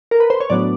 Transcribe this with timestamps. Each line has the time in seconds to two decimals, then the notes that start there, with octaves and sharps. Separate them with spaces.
0.11 A#4
0.20 B4
0.30 C5
0.40 C#5
0.50 A2 F#3 B3 D4 D5